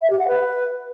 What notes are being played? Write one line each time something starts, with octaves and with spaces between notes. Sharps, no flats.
E5
G4
F#5
B4